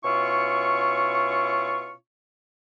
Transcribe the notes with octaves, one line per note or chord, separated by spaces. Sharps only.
B2 C#4 E4 F4 C#6